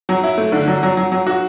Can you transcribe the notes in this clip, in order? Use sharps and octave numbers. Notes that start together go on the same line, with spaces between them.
F#3
E4
A3
D3
F#3
F#3
F#3
F#3
F#4